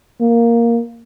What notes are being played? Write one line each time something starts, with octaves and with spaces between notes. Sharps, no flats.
A#3